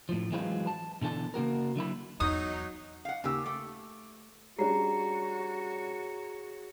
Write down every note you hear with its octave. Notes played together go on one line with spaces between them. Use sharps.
A2 F3
E3 F#3 G#3 C4 F4 B4
A5
B2 D3 E3 A4 A5
C#3 A#3 F#4 A#4
D3 F#3 E4 B5
E2 F#3 D#4 D#6
F5 F#5
D#2 C#3 G4 E6
A3 D6
G3 C#4 D4 F#4 G#4 C#5 A#5 C7